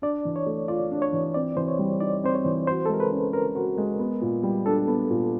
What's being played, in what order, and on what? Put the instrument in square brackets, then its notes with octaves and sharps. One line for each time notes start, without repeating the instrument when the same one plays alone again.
[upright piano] D4 [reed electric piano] D5
[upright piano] E3
[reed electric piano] C#5
[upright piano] A3
[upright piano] F4 [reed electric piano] D5
[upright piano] D4
[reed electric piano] C#5
[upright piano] E3
[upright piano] C4 [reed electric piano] D5
[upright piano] E3 [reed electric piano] C5
[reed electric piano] C#5
[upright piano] G3
[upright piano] D#4 [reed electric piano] D5
[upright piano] C4 [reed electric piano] C5
[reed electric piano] C#5
[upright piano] E3
[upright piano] F#4 [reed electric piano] C5
[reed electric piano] A4
[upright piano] G#3 [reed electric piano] A#4
[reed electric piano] B4
[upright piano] C#4
[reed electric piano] A#4 [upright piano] B4
[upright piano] F#4
G#3
B3
A#2
G3
[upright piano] D4 [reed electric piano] A4
[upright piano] B3
A#2